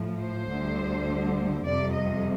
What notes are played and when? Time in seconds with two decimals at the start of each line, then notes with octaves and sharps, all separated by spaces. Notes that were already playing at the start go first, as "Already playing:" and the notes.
Already playing: A2 F3
0.20 C5
0.49 D2 D3 G3
1.65 F2 C3 G3 D5
1.93 D#5